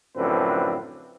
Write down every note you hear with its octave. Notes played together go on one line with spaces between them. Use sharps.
F#2 A2 D3 F3 C4 B4